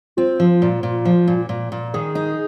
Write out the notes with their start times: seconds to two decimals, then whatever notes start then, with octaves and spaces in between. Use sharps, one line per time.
0.17 C4 F4
0.40 F3
0.62 A#2
0.83 A#2
1.05 F3
1.27 A#2
1.49 A#2
1.72 A#2
1.94 D#3 G#4
2.15 D#4